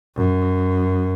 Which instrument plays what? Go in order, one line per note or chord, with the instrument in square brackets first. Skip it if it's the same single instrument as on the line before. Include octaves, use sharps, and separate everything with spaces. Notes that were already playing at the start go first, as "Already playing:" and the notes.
[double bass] F#2